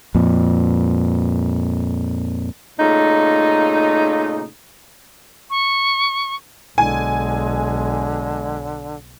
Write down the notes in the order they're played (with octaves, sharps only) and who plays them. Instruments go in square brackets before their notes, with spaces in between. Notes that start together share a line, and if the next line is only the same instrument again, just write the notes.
[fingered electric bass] F2 A#2
[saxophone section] A#2 C#3 A3 D#4
[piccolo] C#6
[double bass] B1 [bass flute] D3 [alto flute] G#3 [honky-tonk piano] G#5